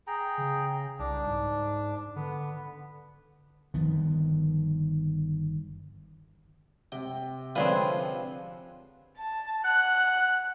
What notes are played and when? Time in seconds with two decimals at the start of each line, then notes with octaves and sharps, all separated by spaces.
0.07 G#4 G5 A#5
0.38 C#3
0.99 C2 D4
1.27 G#2
2.16 D3 B3
3.74 G1 D#3 F3 B3
6.92 C3 G5
7.56 D3 F3 C4 D4 G#4 B4 C#5 F5
9.18 A5
9.64 F#5 F#6